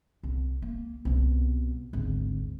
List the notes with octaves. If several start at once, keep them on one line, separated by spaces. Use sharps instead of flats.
C2
A#3
C2 B2
G#1 D2